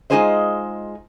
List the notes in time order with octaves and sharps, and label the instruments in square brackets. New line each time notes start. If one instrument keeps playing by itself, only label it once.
[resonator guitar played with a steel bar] G#3 D#4 F4 G#4 C5 D#5